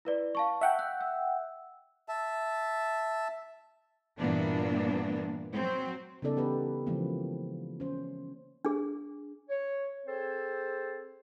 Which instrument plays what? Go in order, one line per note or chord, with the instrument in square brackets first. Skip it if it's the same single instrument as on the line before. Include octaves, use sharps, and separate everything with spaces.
[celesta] E4 B4 D5
F5 A5 C#6
[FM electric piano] E5 F#5 G5
[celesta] F#6
E6
[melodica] E5 A5
[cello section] G2 A#2 E3 A#3 B3 D4
F#3 C4
[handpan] C#3 G3 B3 D#4 A4 D5
E3 B3 G4 B4
C#3 E3 F3 G#3 A#3 C4
C#4 C5
[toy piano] D4 G#4
[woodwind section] C#5
C4 G#4 A4 C5